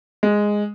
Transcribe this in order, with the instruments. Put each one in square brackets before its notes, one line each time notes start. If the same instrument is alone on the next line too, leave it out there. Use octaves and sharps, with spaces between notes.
[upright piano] G#3